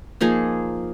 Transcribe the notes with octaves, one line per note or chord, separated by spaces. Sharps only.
F3 A#3 D#4 G#4